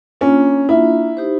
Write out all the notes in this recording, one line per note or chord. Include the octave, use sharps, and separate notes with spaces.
A#3 C#4 D4 F4
A#3 D4 E4 F4
D#4 G4 C5